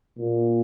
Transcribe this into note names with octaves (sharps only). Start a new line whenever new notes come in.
A#2